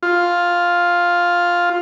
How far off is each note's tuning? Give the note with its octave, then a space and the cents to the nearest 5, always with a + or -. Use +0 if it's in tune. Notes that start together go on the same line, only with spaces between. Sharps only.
F4 +5